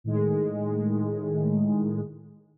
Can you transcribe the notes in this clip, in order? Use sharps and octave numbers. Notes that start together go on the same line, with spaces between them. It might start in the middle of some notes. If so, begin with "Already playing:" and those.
A2 D#3 G#3